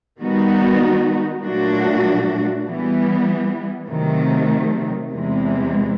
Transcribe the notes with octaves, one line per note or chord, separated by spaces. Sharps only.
D#3 G3 B3 D#4 F#4
A#2 F#3 A3 D4 F#4
E3 G3 B3
C3 D#3 F#3 A3
E2 C3 E3 G#3